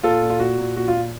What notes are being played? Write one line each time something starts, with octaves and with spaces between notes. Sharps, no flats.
A#2 F4 A4
A#2
F4
A#2 F#4
A#2
A#2 F#4
F4
A#2